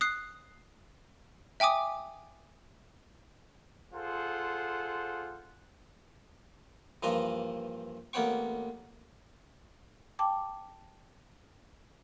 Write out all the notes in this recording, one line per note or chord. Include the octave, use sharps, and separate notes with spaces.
D#6 F#6 C7
E5 G5 G#5 D6 D#6
F4 G#4 A4 C5 F#5
G2 E3 F3 A#3 D#5
A1 A#3 B3 C#5 G5 C#6
G5 A5 D6